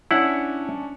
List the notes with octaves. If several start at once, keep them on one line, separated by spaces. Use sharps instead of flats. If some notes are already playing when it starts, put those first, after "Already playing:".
C#4 D4 E4 F#5 C#7